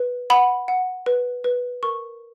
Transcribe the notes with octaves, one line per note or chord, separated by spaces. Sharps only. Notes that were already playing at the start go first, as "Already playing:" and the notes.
Already playing: B4
F#5 B5
F#5
B4
B4
A#4 C#6